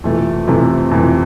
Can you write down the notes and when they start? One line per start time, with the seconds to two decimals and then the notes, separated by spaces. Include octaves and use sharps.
0.04 F2 C3 E3 A3
0.48 F2 C3 E3 A3
0.91 F2 C3 E3 A3